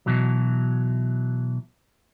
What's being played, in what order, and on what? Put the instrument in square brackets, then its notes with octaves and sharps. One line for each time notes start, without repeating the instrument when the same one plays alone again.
[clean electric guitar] B2 E3 F#3